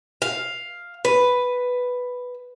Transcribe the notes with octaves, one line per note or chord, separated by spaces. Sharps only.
F5
B4